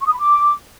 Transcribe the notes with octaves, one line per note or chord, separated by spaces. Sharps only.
C#6
D#6
B5
D6